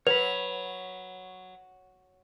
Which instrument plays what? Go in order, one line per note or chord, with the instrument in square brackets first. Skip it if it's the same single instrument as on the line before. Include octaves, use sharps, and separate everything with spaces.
[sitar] F#3 [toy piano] B4 [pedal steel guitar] C#5 B5 [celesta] F7